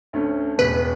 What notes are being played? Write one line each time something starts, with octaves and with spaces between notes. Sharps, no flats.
D2 D3 A3 C#4
E1 E2 B2 B4